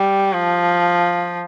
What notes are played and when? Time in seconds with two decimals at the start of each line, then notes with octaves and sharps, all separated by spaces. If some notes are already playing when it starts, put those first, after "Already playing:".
Already playing: G3
0.33 F3